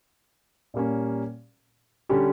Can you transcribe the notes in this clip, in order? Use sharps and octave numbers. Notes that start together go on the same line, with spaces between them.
A#2 G3 A#3 C#4
D3 G3 C#4 G4